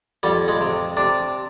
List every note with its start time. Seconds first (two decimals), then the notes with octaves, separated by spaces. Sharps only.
0.23 F2 G3
0.48 G#3
0.61 C3
0.97 C3 D4